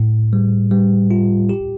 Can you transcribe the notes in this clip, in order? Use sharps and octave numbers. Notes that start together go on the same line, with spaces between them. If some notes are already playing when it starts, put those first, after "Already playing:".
Already playing: A2
G3
G3
F4
G4